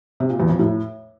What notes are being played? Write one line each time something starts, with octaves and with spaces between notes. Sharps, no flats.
C3
A#2
E2
F2
A2